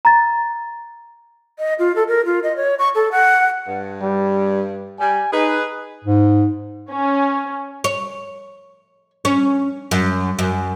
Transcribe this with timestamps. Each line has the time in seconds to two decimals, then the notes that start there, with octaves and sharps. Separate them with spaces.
0.05 A#5 A6
1.59 D#5
1.79 F4
1.96 A4
2.08 A#4
2.25 F4
2.43 D#5
2.56 C#5
2.79 C#6
2.95 A4
3.12 F#5
3.68 G2
4.02 G3
5.00 G3 G#5
5.32 D#4 G#4 B4
6.04 G#2
6.91 C#4
7.84 C#5
9.25 C#4
9.91 F#2
10.39 F#2